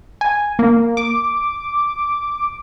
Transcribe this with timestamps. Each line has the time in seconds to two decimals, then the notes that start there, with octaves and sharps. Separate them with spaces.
0.21 G#5
0.59 A#3
0.97 D6